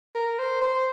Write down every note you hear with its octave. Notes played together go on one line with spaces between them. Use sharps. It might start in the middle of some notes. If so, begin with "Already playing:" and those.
A#4
C5
C5